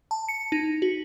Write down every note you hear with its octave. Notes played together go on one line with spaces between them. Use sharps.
A5
C#7
D#4
F#4